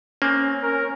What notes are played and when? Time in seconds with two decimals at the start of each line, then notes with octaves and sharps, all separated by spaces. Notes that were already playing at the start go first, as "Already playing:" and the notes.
0.22 A#3 C4 C#4
0.63 A#4